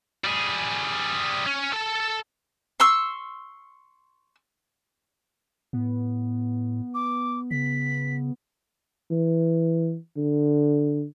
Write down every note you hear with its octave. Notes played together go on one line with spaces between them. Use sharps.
G3 G#4
C#4
A4 A5
C6 C#6 E6
A2 B3
D6
C#3 B6
E3
D3